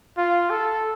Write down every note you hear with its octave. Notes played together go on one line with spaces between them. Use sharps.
F4
A4